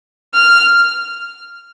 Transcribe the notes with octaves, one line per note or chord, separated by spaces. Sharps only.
F6